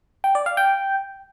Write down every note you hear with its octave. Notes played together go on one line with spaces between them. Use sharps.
G5
D5
F5
G5